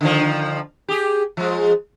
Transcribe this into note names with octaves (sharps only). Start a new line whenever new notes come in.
D3 D#3 F3
G4 G#4
F3 G#3